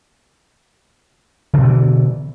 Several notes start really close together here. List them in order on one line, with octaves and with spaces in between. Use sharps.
D3 B2 B3 E3